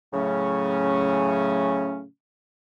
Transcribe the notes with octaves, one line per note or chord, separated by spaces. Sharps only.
A2 C#3 F#3 A3 C#4